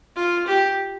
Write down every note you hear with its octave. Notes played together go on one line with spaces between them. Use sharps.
F4
G4